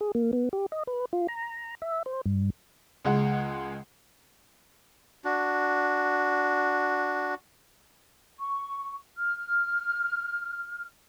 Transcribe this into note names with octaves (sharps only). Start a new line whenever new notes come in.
G#4
A#3
B3
G4
D#5
B4
F4
A#5
E5
C5
G2
C#2 G#3 F#5
D4 F#4
C#6
F6